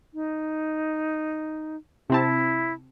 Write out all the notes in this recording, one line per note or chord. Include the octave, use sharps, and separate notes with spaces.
D#4
C3 C4 E4 A5